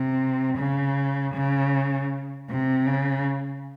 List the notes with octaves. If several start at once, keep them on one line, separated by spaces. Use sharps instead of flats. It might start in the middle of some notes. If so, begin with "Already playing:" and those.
Already playing: C3
C#3
C#3
C3
C#3